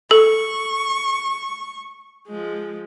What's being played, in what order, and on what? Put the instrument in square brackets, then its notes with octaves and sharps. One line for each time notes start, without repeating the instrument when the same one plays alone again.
[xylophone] A4 [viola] C#6
[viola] F3 G#3